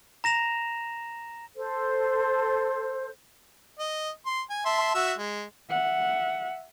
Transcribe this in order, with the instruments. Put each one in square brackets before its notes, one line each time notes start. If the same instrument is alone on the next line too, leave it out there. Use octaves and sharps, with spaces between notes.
[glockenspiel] A#5 A#6 E7 F7
[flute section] A4 C5
[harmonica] D#5
C6
G#5
E5 A5 C6
F#4 E5 E6
G#3
[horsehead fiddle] E5 F#5